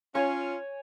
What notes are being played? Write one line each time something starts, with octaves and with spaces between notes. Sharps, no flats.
C#4 F4 C#5 G#5